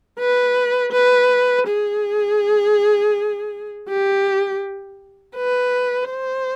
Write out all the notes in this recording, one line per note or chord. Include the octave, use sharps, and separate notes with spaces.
B4
B4
G#4
G4
B4
C5